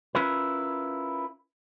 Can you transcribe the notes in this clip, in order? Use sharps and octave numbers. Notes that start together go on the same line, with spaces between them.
C#4 E4 F4 A#4 B4